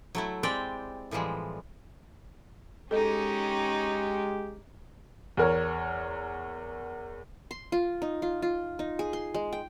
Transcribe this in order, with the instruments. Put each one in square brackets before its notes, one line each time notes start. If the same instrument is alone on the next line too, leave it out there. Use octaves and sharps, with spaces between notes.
[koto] F#3 A3 E4
G#3 C4 G4 D5 G5
A2 E3 F3 G3 G#3
[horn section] G#3 G4 [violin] C#4 D#4 [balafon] A4 D#5
[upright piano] E2 A#4 C#5
[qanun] C6
F4
D#4
F4
F4
D#4
G#4
C6
G#3
G5